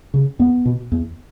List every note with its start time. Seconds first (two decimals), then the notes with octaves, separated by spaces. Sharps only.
0.14 C#3
0.39 E2 B3
0.65 B2
0.92 E2